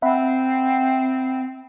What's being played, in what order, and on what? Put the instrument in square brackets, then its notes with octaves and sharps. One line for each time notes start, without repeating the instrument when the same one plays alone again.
[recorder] C4 [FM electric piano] E5 F#5 B5